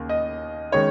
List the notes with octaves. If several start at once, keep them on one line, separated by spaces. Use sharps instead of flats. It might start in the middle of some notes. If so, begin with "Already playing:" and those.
Already playing: D#2 C#3 A#3
D#5
D#3 G#3 C#4 C#5